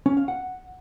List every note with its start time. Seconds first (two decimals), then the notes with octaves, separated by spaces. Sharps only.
0.06 C#4
0.17 F5
0.28 F#5